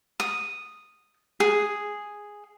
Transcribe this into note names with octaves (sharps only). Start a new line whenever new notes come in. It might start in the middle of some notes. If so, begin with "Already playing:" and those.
D#6
G#4